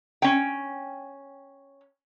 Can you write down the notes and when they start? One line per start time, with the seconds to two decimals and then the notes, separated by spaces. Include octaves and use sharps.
0.22 C#4 G5